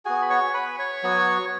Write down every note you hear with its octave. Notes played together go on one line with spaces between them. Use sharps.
B3 F#4 G#4 G#5
B5
C#5 C#6
B4 B5
C#5 C#6
F#3 B3 F#4